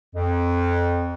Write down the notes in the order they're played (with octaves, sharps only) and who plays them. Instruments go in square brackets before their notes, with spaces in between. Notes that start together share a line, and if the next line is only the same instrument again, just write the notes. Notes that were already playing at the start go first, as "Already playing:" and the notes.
[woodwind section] F2